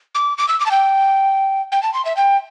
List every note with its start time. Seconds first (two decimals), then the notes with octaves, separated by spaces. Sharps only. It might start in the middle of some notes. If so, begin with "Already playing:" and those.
0.15 D6
0.38 D6
0.49 E6
0.60 D6
0.66 A5
0.71 G5
1.72 G5
1.83 A5
1.94 C6
2.05 E5
2.17 G5